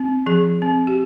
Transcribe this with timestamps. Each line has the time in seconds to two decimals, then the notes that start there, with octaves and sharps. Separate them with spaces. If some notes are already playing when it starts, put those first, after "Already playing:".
Already playing: C4
0.26 F3 G#4
0.62 C4
0.87 G4